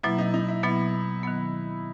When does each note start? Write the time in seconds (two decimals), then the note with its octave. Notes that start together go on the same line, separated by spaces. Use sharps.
0.03 B2 F#3 A#3 E4
0.18 D#4
0.34 D#4
0.48 E4
0.63 B2 F#3 B3 E4
1.23 D#3 F#3 B3